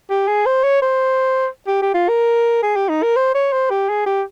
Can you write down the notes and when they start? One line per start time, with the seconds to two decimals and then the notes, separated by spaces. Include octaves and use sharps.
0.10 G4
0.28 G#4
0.46 C5
0.64 C#5
0.82 C5
1.67 G4
1.82 G4
1.94 F4
2.09 A#4
2.63 G#4
2.76 G4
2.89 D#4
3.03 A#4
3.16 C5
3.35 C#5
3.52 C5
3.70 G4
3.89 G#4
4.06 G4